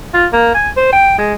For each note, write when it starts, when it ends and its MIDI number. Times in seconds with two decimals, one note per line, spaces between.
0.14 0.27 65
0.33 0.52 58
0.54 0.70 80
0.77 0.90 72
0.93 1.16 79
1.18 1.34 56